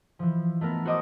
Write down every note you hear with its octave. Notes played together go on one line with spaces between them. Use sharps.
E3 F3
A3 B3 A#4
F#4 C5 D#5 D6 D#6